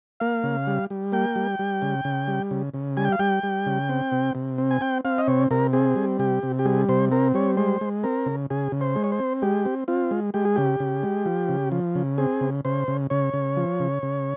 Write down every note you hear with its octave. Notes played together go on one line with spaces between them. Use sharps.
A#3 F5
C#3
G3
G3
A#3 G5
G3
G3
C#3
C#3
G3
C#3
C#3
G3 G#5
G5
F5
G3 G5
G3
C#3
C4
C3
C3
C4
G#5
C4 G5
C4 F5
D#5
C3 C#5
C3 A#4
C4 G#4
G3
C3 G4
C3
G4
G3 G#4
C3 C5
C4 A#4
G3 C#5
G#3 C5
G#3
C4 A#4
C#3
C#3 G#4
C#3
C5
G#3
C#5
C5
C4
G#3 G4
C4
C4 F4
G#3
G#3 G4
G#4
C#3 G4
C#3
G#3
F3
C#3
F3
C#3
C4 G#4
C#3
C#3 C5
C#3
C#3 C#5
C#3
F3
C#3
C#3